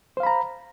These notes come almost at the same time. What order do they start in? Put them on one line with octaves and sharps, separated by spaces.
C5 F5 B5 A#5